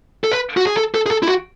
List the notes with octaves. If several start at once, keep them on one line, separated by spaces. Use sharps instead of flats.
A4
B4
F#4
G#4
A4
A4
G#4
A4
E4
F#4